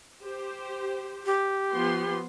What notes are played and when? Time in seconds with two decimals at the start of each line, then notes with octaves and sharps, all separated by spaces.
0.23 G4 C5
1.26 G4
1.72 F3 B3 C6